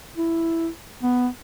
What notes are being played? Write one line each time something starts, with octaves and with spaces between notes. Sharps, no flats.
E4
B3